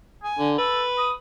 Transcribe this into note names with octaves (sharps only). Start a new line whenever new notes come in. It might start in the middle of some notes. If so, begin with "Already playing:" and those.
G#5
D3
A4 B4
D#6